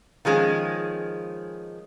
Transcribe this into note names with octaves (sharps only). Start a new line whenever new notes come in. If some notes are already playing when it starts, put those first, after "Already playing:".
D#3 F3 G#3 C#4